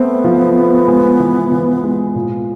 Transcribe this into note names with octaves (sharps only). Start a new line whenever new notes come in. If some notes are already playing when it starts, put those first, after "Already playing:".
Already playing: A3 B3 C4
F3
C4
G#3
E3
E3
G#3
A#2